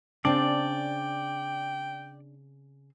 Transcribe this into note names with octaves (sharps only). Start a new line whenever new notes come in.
C#3 C4 D4 D5 G5